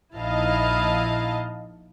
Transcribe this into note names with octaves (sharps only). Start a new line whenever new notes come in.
A#1 D#4 E4 D#5 F5 A5